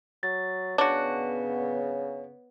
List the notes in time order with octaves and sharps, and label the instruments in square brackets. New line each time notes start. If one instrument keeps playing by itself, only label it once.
[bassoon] F#3 [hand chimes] A6
[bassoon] C#3 [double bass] B3 [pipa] D4 F#4 [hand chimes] C#5